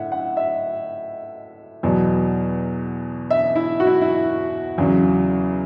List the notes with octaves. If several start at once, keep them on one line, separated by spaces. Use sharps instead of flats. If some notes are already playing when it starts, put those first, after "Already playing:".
Already playing: A2 E5 F#5
F#5
E5
E2 B2 F#3
E5
E4
F#4
E4
E4
E2 C#3 F#3